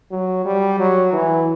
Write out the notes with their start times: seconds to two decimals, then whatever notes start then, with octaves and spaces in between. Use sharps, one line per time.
0.11 F#3
0.46 G3
0.79 F#3
1.13 E3